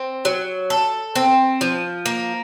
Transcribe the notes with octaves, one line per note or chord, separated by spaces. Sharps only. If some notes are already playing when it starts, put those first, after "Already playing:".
Already playing: C4
F#3
A4
C4
F3
A#3